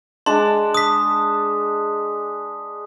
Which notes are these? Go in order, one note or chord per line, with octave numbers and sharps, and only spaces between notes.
G#3 D4 A5 C6
D#6 B6